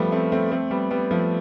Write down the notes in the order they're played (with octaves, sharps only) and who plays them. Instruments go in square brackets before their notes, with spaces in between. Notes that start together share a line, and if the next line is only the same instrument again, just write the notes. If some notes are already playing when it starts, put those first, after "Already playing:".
Already playing: [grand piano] F3 G3 A3 B3
A3 C4
A3 C4
A3 C4
G3 B3
G3 B3
F3 A3